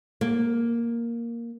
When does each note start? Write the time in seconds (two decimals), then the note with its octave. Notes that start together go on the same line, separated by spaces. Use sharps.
0.21 A#3